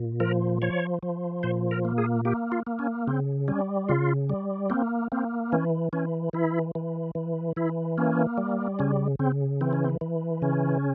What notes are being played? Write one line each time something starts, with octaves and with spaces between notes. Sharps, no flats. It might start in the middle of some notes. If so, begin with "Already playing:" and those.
Already playing: A#2
F3 A#4
F3 C#5
F3
A#2 C5
A#4
A#3
G#4
A#3 G4
F4
A#3
C#4
C#3 C4
G3 C#4
C#3 F4
G3
A#3 C4
A#3 C4
E3 C#4
E3 C#4
E3 E4
E3
E3
E3 E4
A#3 C#4
G3
C#3 C#4
C#3 C4
E3 C4
C#4
C4
E3
C#3 C#4